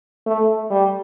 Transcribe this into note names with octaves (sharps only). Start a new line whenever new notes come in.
A3
G3